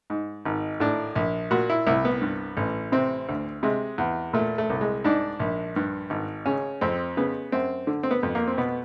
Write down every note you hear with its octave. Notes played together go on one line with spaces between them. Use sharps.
G#2
G#1
A2 D4
A#1
A#2 F#4
E4
C2 E4
B3
G2
A1
C3 C4
D2
C3 G#3
E2
A#2 A3
A3
C2
G#3
G#2 D4
A#1
G2
G#1
C#3 C#4
F2 C4
C#3 B3
F#2 C4
D3
C4
B3
F2
A#3
C4
B2 B3